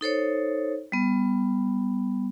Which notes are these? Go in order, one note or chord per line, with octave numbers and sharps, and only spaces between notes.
D#4 A4 C5 C#5
G3 B3